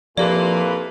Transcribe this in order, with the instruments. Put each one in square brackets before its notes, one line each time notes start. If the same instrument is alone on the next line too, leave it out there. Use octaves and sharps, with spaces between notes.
[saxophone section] F2 E4 B4 [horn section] A#2 A#3 [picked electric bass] F3 [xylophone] G4 D5